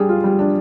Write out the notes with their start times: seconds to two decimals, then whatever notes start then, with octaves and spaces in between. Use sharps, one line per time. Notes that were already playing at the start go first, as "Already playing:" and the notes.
Already playing: G3 D4 G#4
0.09 F4
0.24 G3
0.39 D4